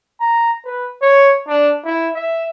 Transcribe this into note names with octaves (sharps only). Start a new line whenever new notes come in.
A#5
B4
C#5
D4
E4
E5